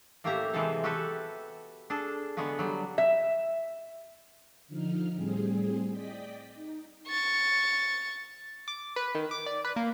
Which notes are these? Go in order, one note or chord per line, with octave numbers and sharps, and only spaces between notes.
A2 A#3 C#4 G4 E5 A#5
C3 E3 G#3 B3 C4 A4
F#4 G4 A4 B4 E5
D4 G#4 A4
D3 G#3 B3 F#4 B4
F#3 G3
E5
D3 F3 D#4 F6
A2 G3 C4 G#4
D5 D#5 G5 B6
D#4
C#6 A6
D6
B4
D#3
D6
D5
B4
A#3